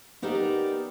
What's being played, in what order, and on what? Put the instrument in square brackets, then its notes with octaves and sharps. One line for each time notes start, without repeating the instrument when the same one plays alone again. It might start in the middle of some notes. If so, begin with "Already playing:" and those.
[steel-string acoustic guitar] B3 D#4 G4 A#4 D5 E5